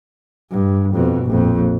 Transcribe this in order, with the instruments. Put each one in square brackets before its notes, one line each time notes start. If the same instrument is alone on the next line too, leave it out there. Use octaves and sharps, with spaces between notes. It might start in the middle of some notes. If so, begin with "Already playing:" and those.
[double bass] G2
F2 B2
A#1 F2